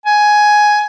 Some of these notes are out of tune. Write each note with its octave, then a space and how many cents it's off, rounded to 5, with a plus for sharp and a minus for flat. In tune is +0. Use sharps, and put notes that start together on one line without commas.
G#5 +10